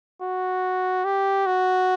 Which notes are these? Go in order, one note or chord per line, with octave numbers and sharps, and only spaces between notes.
F#4
G4
F#4